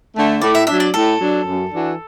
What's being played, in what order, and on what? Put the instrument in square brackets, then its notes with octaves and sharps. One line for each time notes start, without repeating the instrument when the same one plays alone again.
[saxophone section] D3 A3
[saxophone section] A2 [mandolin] D5
[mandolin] E5
[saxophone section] F#3 D4 [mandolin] E5
[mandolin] D5
[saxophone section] A2 [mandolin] A4
[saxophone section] F#3 D4
F#2
E3 D4 F#4